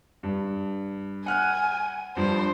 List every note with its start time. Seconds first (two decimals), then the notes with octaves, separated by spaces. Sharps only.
0.23 G2
1.26 F#5 G#5 F6 F#6
2.17 G2 F3 C5